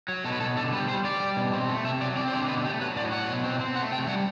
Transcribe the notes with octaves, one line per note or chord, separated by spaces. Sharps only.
F#3
B2 A4
B4
B2 A4
D3 A4
G3 B4
G3 C5
G3 D5
G3
B2
C4
A3
C3 E5
F#3 D5
C4 D5
C5
D3 D5
B2 B4
A3 G4
F#3 B4
A2 D5
F#3 F#5
B2
C4
C4
A3 F#5
C3 G5
G3 F#5